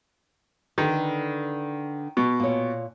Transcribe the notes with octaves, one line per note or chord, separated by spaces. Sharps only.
D3 D#3 B4
B2
A#2 C#5